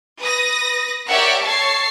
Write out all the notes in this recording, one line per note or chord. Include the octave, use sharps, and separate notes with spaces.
B4 D#6 A#6
G4 A#4 C#5 D5 E5 F#5
A4 C#5 A5 C#6 A6 C7